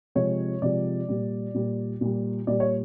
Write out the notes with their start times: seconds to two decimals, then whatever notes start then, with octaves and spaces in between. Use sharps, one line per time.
0.15 C3 F3 G#3 C#5
0.62 C3 F3 G#3 D5
1.08 A#2 G3
1.55 A#2 G3
2.01 A#2 G3
2.47 A#2 G3 D5
2.60 C#5